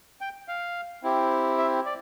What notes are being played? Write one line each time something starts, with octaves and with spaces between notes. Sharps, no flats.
G5
F5
C4 E4 G4
E5
D5